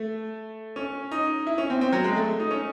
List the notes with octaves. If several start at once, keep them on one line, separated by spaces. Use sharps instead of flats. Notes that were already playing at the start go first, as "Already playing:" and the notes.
Already playing: A3
C#4
D#4
E4
C#4
C4
C4
F#3
G#3
A3
D#4
C#4